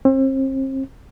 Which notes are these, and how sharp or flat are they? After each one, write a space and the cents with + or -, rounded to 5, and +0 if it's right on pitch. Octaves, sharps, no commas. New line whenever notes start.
C4 +35